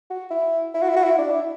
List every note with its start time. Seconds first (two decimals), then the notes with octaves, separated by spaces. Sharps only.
0.10 F#4
0.30 E4
0.74 E4
0.82 F#4
0.89 E4
0.96 F#4
1.04 E4
1.18 D4
1.30 E4